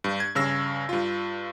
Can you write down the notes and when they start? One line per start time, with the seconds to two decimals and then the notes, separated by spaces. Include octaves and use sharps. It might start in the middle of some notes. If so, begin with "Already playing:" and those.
0.04 G2
0.20 G#6
0.35 G2 C#3 E6 A#6
0.89 G2 F4